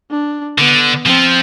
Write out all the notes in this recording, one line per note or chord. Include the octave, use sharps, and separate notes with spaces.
D4
D3 B3
F3 C4